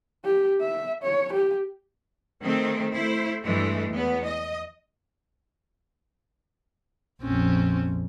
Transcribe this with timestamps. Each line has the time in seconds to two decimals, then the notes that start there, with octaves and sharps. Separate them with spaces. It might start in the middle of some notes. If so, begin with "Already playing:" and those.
0.25 G4
0.61 E5
1.03 C#5
1.33 G4
2.41 D#3 A3 C4 G#4
2.92 A3 E4 C5
3.45 G2 E3 G#3 A3
3.91 E2 B3
4.24 D#5
7.23 A#1 F2 C4 C#4